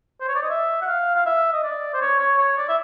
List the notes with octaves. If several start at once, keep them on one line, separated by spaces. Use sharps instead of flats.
C5
C#5
D5
D#5
E5
F#5
F5
F5
E5
D#5
D5
C5
C#5
C#5
C#5
D5
E5